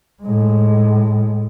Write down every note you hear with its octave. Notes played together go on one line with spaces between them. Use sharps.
A2 G#3